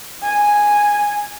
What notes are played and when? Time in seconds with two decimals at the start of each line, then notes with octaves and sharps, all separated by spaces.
0.23 G#5